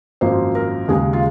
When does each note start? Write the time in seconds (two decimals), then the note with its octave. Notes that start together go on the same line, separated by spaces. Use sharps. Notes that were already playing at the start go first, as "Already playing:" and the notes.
0.21 G#1 F#2 F3 A#3 C5
0.55 A#4
0.88 D#2 C#3 G#3 G#4
1.13 F4